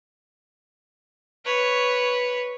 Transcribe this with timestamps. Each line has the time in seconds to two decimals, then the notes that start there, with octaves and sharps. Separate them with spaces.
1.45 B4 C#5